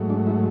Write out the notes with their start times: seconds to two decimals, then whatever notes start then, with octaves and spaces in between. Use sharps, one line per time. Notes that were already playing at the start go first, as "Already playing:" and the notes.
Already playing: G#2 F#3 A3
0.10 D4
0.27 E4